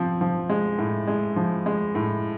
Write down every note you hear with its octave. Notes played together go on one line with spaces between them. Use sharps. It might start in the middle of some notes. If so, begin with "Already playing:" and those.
Already playing: F3 C4
F3
G#3
A2
G#3
F3
G#3
A2